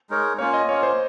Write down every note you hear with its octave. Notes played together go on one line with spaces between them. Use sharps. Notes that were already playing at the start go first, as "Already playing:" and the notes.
G#3 D#4 A#4 C#5
A#3 C#4 F4 C#5
D#5
A#3 C#4 F4 C#5
C5